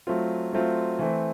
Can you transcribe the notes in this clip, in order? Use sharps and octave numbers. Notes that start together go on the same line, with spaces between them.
F#3 A3 C4 F4
F#3 A3 C4 F4
E3 A3 C4